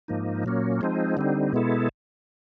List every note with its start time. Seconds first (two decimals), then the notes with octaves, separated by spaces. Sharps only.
0.08 G#2 F3 A#3 D#4
0.44 A#2 F#3 A#3 C#4
0.81 F3 G#3 C4 D#4
1.17 D3 G3 C4 D#4
1.53 B2 G#3 B3 E4 A4